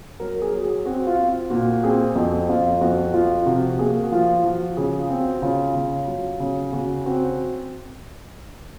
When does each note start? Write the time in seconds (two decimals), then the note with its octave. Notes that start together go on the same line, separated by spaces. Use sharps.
0.20 F#3 A#4
0.42 G#4
0.52 F#3
0.64 G#4
0.85 C4 F#4
1.07 F4
1.18 C4
1.29 F4
1.50 A#2 F#4
1.83 C4 G#4
2.15 F2 F#4
2.49 F2 F4
2.81 F2 F#4
3.14 F3 F4
3.46 C3 F#4
3.79 A#3 G#4
4.03 F#4
4.12 F3 F4
4.44 F3 F#4
4.77 C#3 G#4
4.99 F4
5.10 C4
5.21 F#4
5.42 C#3 F4
5.75 C#3
6.08 F#3
6.40 C#3
6.73 C#3 F#4
7.06 C4 F#4